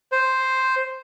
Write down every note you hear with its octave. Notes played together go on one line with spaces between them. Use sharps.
C5